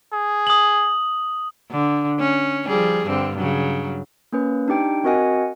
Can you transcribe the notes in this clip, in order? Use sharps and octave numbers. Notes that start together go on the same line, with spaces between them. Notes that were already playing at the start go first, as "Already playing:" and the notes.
G#4
D#6 F#7
D3
C#4
F3 G3 G#4
G2 D3 C4
C#3 F#3
A#3 C#4 B4
D4 D#4 G4 G5
C4 F#4 A#4 D#5 F#5 G#5